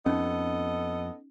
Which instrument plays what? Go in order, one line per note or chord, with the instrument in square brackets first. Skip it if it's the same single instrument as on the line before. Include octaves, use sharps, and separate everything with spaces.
[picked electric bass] F2 [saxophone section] B3 A4 D#5 [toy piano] C#4 D#4